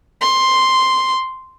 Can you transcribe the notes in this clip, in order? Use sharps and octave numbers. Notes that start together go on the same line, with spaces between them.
C6